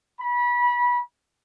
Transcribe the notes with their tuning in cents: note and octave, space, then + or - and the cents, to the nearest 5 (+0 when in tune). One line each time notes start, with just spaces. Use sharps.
B5 -25